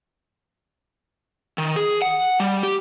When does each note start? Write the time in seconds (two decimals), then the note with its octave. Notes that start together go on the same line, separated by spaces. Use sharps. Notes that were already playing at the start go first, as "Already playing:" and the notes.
1.58 D#3
1.76 G#4
2.02 F#5
2.40 G3
2.63 G4